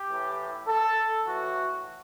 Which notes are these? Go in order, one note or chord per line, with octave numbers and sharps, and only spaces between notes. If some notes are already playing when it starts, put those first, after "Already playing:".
Already playing: G4
A2 E3
A4
A2 E3 F#4